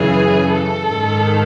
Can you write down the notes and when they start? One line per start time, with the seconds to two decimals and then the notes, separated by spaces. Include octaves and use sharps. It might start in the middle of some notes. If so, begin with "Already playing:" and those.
Already playing: F#2 C#3 E3 G#4
0.50 A4
0.89 G#2 D#3